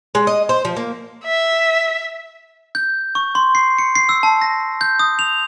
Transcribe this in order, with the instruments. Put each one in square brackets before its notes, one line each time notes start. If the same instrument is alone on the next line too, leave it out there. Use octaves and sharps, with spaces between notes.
[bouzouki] G#3
D#5
C5
F3
A#3
[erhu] E5
[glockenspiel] G6
C#6
C6
C7
C#7
C7
E6
A5
A#6
G6
D#6
F7